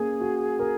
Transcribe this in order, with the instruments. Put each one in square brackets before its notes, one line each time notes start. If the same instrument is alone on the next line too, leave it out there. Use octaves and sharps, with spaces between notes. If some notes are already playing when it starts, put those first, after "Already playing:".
Already playing: [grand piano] A#3 C#4 [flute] G#4
[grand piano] F#4
A#4